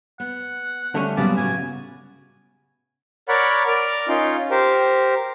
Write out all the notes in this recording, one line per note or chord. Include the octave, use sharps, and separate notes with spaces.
B3 F#5
D3 G3 A3 C#4
A#2 C#3 F#3 G3 B3 D5
A2 F#4 G#5
A#4 C#5 D5 F#5 B5
A#4 D5 D6 F6
C#4 D#4 F4
G4 A#4 C5